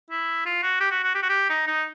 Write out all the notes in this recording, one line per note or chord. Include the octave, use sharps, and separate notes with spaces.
E4
F4
F#4
G4
F#4
F#4
G4
F#4
G4
D#4
D#4